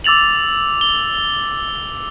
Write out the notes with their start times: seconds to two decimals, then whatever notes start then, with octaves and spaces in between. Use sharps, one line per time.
0.04 D6 E6 A6 F7 F#7
0.81 G7